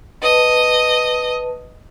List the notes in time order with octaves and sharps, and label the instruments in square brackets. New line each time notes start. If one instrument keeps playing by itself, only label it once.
[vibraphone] B4 A5 [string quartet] D#5